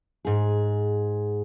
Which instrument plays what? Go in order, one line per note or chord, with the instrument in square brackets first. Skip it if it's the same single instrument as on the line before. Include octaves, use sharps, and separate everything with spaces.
[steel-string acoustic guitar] G#2 G#4